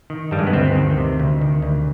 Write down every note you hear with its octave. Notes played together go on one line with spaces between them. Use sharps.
D#3
G2 G3
G#3
B3
D2 C4
D#3
C3
D2
D#3
D2